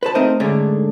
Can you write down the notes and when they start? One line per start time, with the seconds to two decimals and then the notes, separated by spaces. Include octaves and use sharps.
0.03 B4 C5 A5
0.15 A3 C4 D#4 A#4 C5 D#5
0.40 G#2 D3 A3 C#4 D4 G#4